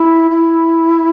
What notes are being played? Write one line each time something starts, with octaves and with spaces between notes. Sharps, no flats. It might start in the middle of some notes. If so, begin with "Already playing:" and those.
Already playing: E4
E4